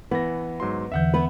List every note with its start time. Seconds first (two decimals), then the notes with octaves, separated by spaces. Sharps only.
0.11 E3 B3 A#6
0.60 G#2 F#3 C6
0.92 E2 D3 E3 E5 F#5 G6
1.14 B3 B4